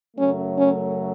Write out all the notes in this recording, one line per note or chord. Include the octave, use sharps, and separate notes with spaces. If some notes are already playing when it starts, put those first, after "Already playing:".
F#2 C#3 F#3 A3 C#4
C#4